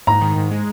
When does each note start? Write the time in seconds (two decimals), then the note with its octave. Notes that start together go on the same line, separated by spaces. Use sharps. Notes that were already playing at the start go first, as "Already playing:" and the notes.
0.07 G#2 A#5
0.21 D#3
0.36 G#2
0.51 G#3